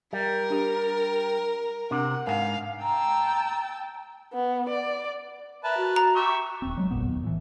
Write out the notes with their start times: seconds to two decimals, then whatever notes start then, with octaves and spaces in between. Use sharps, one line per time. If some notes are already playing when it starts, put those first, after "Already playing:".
0.13 G3 A#4
0.50 D4 G4
1.91 C3 D4 F#5
2.27 G#2 A#4 F5 F#5
2.82 G5 A5 A#5 E6
4.33 B3
4.69 D5
5.64 A#4 B4 E5 A5
5.77 F#4
5.96 A#5
6.15 G4 E5 C#6
6.62 D#1 C4
6.77 F#3 G#3
6.91 F1 A#1 A#2 B3
7.08 D#2
7.23 A2 E3